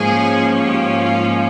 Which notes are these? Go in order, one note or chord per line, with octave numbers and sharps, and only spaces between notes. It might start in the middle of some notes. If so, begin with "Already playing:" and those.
Already playing: G#2 F3 G#3 A#3 C#4 G#4
G4
F4 F5